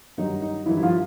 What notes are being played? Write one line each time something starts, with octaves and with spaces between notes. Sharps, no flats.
G2 D#3 F#3 D#4
D#4
G2 D#3 E3 F#3 E4
E4
F3 F4